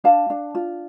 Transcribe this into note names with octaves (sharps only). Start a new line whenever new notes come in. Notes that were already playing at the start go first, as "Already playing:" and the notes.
D4 F5 A5
D4
F4